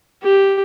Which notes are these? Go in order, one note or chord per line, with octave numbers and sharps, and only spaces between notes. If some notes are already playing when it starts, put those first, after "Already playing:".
G4